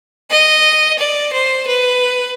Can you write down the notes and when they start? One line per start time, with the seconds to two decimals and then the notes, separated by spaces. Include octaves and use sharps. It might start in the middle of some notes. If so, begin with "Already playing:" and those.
0.31 D#5
0.99 D5
1.33 C5
1.67 B4